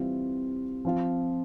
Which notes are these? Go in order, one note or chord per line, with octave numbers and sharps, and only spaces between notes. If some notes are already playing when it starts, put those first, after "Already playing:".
Already playing: E3 G3 C4 F4
F3 C4 F4